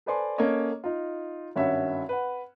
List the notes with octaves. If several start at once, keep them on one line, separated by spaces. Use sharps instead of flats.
A4 B4 C5 D5 G#5 C6
A#3 C#4 A4 C#5 D#5
D#4 F4
G#1 G2 C#4 F#4 C#5 E5
B4 F#5